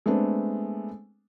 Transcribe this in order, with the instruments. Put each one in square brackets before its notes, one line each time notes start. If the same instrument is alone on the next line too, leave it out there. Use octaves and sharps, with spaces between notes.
[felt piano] G#3 A3 B3 C4 D4